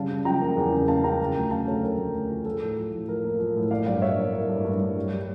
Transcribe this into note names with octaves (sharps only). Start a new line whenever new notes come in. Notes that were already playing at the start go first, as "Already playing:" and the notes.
Already playing: C#3 G3 F5 A5
C#3
F3 G5 A#5
A#3
E2
C#3
A#3 F5 A5
C#3 G5 A#5
C#3
D2
C#3 F5 A5
D2 A4 C#5
F3 A#4
D2
D2
F3
F3 A4
A2
F3
A2
F3 A#4
A#3
F3
A2
A#3 D5 F5
G2 D5 F5
G2 C#5 E5
A#3
A#3
G2
G2
G2
G3
G3